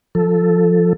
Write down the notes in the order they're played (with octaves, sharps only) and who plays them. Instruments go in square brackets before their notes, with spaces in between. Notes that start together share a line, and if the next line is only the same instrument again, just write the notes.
[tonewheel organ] F3 A4